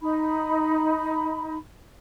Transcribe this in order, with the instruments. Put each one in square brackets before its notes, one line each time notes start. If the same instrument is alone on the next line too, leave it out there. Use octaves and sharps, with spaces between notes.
[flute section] D#4 B5